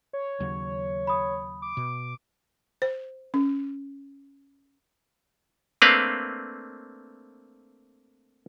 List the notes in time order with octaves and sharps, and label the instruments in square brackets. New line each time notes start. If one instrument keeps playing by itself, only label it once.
[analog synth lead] C#5
[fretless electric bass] D#2 C#3 F#3
[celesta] B5 D#6
[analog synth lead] D6
[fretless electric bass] B2
[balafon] C5
C#4
[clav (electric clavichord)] A3 A#3 C4 D4 B4 F5